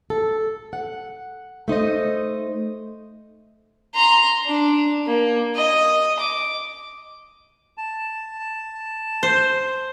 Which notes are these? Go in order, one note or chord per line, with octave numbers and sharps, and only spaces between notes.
A4
F#5
A3 D#4 C5 D#5
A#5 C6
D4
A#3
D#5
D6
A5
C5